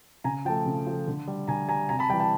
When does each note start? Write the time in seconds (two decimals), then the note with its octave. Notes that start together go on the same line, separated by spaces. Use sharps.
0.24 C#3 G#5 A#5
0.45 F3 A3 G5 A5
0.66 C#3
0.86 F3 A3
1.07 D3
1.28 G3
1.48 D3 G#5 A#5
1.68 G3 G#5 A#5
1.89 C3 G#5 A#5
1.99 A5 B5
2.09 G3 G5 A5
2.13 E3
2.20 G5 A5